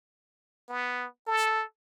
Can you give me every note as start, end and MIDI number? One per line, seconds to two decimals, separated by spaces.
0.69 1.06 59
1.27 1.63 69